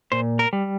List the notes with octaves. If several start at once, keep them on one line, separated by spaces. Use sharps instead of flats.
A#2 C5
A#4
G3